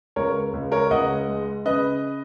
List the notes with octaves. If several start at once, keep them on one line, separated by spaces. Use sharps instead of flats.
C#2 A#4 C#5
C#2
A#4 C#5
C#2 D#5 F#5
G#3
C#3 B4 D#5